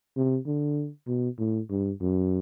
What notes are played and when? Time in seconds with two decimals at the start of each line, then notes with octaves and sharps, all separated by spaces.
0.16 C3
0.46 D3
1.07 B2
1.38 A2
1.70 G2
2.00 F#2